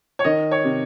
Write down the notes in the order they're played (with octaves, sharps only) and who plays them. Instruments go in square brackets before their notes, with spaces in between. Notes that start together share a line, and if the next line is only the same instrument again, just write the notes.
[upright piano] C#5
D#3 D#5
C#5
C3